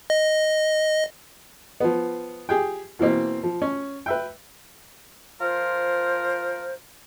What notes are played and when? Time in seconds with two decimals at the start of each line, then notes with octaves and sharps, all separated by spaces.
0.10 D#5
1.80 F3 B3
2.49 G4 G#4 G5
2.99 B2 E3 A#3 C4
3.43 F3
3.62 C#4
4.06 B4 E5 G5
5.41 F3 F4 A#4 C5